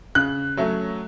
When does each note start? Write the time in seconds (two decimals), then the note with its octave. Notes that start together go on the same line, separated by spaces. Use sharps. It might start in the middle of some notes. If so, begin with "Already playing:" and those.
0.15 C#3 F#6
0.57 F#3 A3 C#4